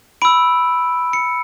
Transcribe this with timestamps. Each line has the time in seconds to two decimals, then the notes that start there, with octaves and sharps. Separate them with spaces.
0.22 B5 E6 D7
1.13 C#7